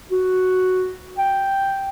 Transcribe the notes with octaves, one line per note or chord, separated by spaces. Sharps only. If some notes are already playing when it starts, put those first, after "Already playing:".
F#4
G5